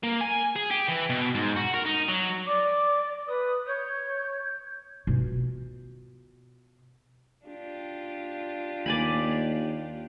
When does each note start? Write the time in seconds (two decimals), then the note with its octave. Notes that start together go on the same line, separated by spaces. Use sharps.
0.03 A#3
0.21 G#5
0.56 G#4
0.71 G4
0.88 E3
1.10 B2
1.35 G#2
1.56 F#4
1.74 A#4
1.86 D#4
2.09 F#3
2.47 D5 D6
3.28 B4 D#6
3.67 C#5 G6
5.07 B2 F4
7.46 D4 F4 G4
8.86 D#2 D5 G#5 B5